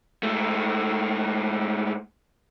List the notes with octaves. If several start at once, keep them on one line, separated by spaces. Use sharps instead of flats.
G#2 A3